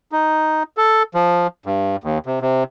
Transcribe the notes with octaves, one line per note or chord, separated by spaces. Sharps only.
D#4
A4
F3
G2
D#2
C3
C3